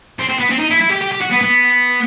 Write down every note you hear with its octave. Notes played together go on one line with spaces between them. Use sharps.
C4
C4
B3
C4
D#4
E4
E4
G4
G4
G4
F#4
B3
B3